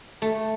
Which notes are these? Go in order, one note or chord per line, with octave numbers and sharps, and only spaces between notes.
A3